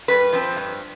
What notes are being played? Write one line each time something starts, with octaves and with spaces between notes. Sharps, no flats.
G2 B4
F3 C4
G2